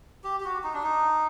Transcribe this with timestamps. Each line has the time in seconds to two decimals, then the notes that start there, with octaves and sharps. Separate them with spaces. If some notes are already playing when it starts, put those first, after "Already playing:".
0.24 G4
0.40 G4
0.45 F#4
0.64 D#4
0.74 D4
0.83 D#4